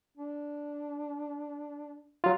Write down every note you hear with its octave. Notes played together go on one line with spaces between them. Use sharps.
D4
F#3 F4